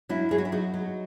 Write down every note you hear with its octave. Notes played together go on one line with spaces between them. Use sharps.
F#3 C#4 E4
F#3 G#4
F#4
E4
F#3 D#4 F#4
F#3